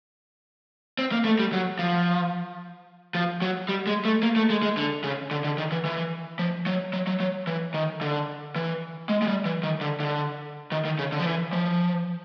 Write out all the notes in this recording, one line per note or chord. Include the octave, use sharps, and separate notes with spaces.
C4
A#3
A3
G3
F#3
F3
F3
F#3
G3
G#3
A3
A#3
A3
G#3
G#3
D3
C#3
D3
D3
D#3
E3
E3
F3
F#3
F#3
F#3
F#3
E3
D#3
D3
E3
G#3
G#3
G3
E3
D#3
D3
D3
D#3
D#3
C#3
D3
F3
E3
F3